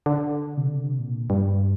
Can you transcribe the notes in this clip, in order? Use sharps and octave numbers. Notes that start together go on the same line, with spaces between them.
D3
C3
D3
C3
A#2
G2